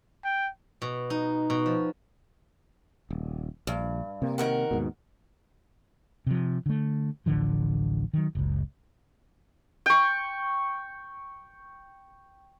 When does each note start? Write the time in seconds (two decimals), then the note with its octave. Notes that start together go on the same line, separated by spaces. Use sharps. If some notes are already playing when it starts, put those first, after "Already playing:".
0.24 G5
0.82 B2
1.10 D#4
1.50 B2
1.66 F3
3.11 D#1
3.67 A#1 G2
4.22 C3 A#3
4.38 D#3 A#4 F#5
4.71 D#2 G#2 B2
6.27 C3 F3
6.66 D3 A3
7.26 D1 A1 D3 F3
8.13 D#3 F#3
8.35 F#1 C#2
9.86 G5 C#6